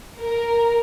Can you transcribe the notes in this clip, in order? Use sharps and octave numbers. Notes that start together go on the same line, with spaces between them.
A#4